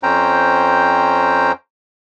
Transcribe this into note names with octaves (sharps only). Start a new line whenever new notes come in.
F2 C#4 C5 G5 A#5